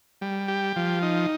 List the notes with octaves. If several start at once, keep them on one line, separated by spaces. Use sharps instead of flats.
G3
G4
F3
D#4